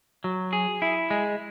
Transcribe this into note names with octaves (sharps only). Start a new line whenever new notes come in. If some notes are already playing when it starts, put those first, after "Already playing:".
F#3
G#4
E4
G#3